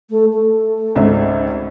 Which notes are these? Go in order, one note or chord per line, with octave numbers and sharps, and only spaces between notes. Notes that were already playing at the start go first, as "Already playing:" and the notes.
A3
A3
G#1 C#2 E5